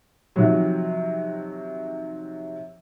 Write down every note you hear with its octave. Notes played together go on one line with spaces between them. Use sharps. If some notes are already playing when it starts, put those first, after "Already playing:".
C3 D#3 F3 F#3